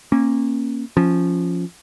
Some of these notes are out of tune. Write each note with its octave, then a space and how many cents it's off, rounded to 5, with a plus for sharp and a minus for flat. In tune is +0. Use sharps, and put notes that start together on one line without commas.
A#3 +0 C#4 -25
F3 +0 C#4 +0